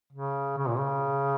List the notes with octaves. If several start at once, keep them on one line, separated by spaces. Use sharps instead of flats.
C#3
C#3
A#2
C#3